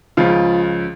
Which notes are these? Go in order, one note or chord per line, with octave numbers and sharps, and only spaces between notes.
C#2 C#3 F3 F4